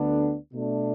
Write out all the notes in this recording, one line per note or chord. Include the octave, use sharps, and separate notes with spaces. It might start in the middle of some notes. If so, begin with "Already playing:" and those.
Already playing: D2 D3 B3 D4
B2 A3 D4